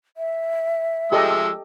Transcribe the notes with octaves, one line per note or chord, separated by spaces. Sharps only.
E5
F3 G#3 G4 A4 D#5 E6